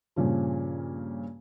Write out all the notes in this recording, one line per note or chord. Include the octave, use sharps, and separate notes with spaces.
G2 A#2 C#3 F3